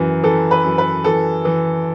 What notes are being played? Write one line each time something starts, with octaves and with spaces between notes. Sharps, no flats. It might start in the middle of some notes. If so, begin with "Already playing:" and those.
Already playing: F#2 E3
E3 A4
B4
F#2
B4
E3 A4
E3